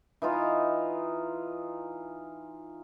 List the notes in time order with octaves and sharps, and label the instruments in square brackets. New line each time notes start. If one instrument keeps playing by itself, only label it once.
[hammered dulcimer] E3 D#4 F4